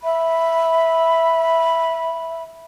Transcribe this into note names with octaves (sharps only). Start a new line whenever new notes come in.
E5 B5